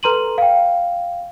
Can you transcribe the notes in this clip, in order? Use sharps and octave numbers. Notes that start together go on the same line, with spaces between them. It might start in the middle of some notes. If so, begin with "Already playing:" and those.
A4 B4 A#5 C6 D#7 F#7
F5 G5